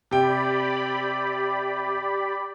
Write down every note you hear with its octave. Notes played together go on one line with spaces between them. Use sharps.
C3 G4 D5 G5 B5